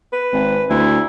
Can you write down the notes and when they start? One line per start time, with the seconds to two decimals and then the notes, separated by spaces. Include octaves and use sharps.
0.13 B4
0.32 G#1
0.70 D2 E4